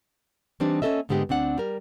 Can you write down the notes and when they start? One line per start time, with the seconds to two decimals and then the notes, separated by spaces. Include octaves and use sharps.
0.60 E3 G3 C4 D4 D#4
0.82 A#3 C#4 E4 A4 D#5 E5
1.09 G#2 D3 G#3 B3 G4
1.29 D2 C4 D4 F#5
1.58 G3 A#4